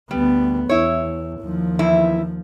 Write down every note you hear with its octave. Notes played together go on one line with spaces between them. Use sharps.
D2 G3 B3
E2 E4 C#5
D#2 F3
E2 E3 E4